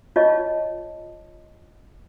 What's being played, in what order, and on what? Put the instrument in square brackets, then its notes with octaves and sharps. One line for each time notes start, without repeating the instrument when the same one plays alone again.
[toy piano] F4 C#5 D#5 A5